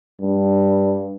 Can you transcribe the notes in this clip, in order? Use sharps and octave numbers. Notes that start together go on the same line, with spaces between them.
G2